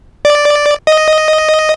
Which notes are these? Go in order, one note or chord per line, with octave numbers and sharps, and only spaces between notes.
D5
D#5